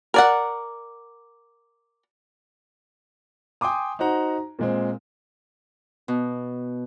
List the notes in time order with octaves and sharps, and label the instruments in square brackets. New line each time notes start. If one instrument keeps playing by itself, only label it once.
[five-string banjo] A#4 D5 F#5
[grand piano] G5 G#5 C6 D6 D#6
D#4 F#4 C5 F#5 A#5
A#2 G#3 C4
[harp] B2